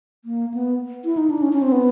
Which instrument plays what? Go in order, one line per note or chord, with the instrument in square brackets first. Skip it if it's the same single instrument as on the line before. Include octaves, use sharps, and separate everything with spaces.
[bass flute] A#3
B3
E4
D#4
D4
C#4
C#4
C4
B3